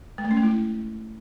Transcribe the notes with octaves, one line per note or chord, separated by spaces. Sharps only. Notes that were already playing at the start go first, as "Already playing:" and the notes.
G#3
A3
C#4
A3
E4